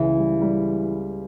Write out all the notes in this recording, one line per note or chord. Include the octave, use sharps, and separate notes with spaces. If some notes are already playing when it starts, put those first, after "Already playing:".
Already playing: C#2 C#3 E3
G3
G3